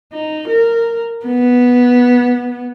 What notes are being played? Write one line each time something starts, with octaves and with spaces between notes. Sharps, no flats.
D#4
A#4
B3